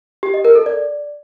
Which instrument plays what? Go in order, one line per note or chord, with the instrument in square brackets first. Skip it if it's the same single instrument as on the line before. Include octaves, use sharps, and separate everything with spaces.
[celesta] G4
D#5
A#4
A4
D5